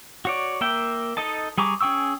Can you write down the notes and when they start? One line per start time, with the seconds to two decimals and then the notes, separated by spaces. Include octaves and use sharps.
0.25 F#4 C#5 D5
0.61 A#3 A#4 E5 G5
1.17 D#4 A4 D#5 A5
1.58 G3 G#4 A#5 C#6 D6
1.81 C#4 G#4 G5 C#6 E6